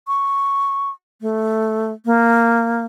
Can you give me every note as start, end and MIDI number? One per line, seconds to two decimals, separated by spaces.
0.08 0.90 85
1.21 1.92 57
2.05 2.85 58